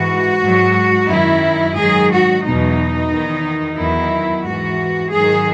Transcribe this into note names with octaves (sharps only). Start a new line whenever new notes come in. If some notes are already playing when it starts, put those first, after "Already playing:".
Already playing: G#2 E3 F#4
G#2 F#3
F#2 D#3 F#3 E4
G#2 D#3 F#3 G#4
F#4
E2 B2 F#3 D#4
E2 D#3 F#3
E2 D#3 F#3 E4
G#2 E3 F#4
G#2 D#3 F#3 G#4